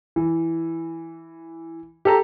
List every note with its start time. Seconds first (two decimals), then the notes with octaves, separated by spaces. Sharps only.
0.16 E3
2.05 G4 A4 A#5